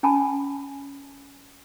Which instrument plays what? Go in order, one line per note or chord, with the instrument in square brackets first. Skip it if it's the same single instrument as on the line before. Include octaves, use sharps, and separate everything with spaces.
[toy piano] C#4 G#5 A5 B5